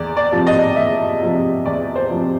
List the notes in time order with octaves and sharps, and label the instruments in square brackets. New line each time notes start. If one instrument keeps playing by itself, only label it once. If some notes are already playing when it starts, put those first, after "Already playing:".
Already playing: [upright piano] E2 D5
D5
C3 F3
D#5
E2 E5
C3 F3
E2 D5
C5
C3 F3